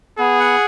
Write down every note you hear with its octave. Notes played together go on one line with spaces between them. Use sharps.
B3 G#4
F#5